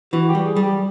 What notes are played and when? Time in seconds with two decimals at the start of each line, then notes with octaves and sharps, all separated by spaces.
0.13 E3 F#4
0.29 G4
0.35 G3
0.46 G#4
0.56 G3
0.62 G4